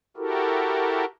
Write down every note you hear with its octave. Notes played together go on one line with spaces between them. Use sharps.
E4 F#4 G4 A4 A#4